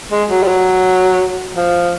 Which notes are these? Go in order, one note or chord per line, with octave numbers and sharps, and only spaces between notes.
G#3
F#3
G3
F#3
F3